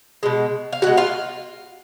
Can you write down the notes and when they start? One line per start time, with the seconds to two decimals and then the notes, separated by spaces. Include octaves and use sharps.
0.23 B2 G#3
0.73 F5
0.82 B2 G#3 F#4 F#5
0.97 F4 F5